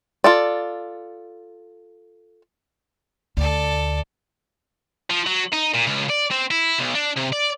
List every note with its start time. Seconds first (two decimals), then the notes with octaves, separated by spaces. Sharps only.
0.24 F4 A4 D5
3.37 D2 A4 D5
5.10 F3
5.27 F#3
5.53 D#4
5.74 A#2
5.87 C#2
6.10 D5
6.31 C4
6.51 E4
6.78 B1
6.94 D4
7.16 C3
7.32 D5